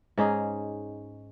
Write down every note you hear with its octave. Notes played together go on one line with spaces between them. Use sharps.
G#2 C#4 D#4 G#4